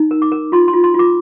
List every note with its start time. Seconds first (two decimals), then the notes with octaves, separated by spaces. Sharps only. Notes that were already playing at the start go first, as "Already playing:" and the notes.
Already playing: D#4
0.11 A#4
0.22 D6
0.32 A#4
0.52 F4 C6
0.68 C6
0.73 F4
0.84 C6
0.94 F4 D6